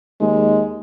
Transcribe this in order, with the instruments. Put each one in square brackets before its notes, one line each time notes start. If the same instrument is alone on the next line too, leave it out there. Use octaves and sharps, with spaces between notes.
[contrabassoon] D#2 [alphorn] G#3